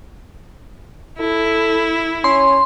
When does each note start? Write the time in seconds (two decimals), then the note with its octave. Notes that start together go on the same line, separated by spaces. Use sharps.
1.19 E4 A4
2.24 C#4 C6